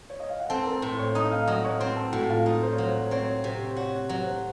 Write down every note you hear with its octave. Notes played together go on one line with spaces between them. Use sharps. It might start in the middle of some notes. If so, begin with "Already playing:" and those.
C#5
D#5
F5
F#5
C4 A4 A5
A#4 A#5
A2 C5 C6
C#5 C#6
D#4 D#5 D#6
F5 F6
F#3 D#5 D#6
C#5 C#6
C4 C5 C6
A4 A5
A2 F#4 F#5
F4 F5
D#4
C5
C#5
F#3 C5
C#5
C4 C#5
C3 C5
F#4 C#5
F#3 C#5
C5